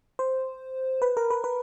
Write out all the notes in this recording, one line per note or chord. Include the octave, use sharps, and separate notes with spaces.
C5
B4
A#4
B4
B4